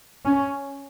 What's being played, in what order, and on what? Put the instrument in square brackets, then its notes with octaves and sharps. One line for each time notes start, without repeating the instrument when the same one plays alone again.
[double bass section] C#4